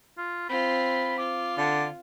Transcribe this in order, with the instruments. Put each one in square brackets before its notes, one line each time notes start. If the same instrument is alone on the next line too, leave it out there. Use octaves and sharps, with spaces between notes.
[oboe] F4
[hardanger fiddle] C4 F4 [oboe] B5
[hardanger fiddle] F4 [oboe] D6
[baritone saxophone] D3 [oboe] D5